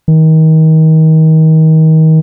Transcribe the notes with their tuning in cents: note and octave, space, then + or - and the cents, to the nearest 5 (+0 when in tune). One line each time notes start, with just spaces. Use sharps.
D#3 +30